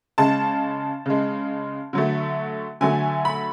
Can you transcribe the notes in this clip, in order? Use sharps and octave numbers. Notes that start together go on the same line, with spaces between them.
C#3 G#3 A5
C#3 G#3
D3 F#3 A3
D3 F#3 A3 G#5
B5